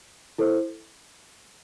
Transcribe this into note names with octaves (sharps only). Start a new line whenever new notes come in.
E4 A4 C5